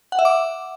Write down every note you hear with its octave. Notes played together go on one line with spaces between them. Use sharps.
F#5
E5
D6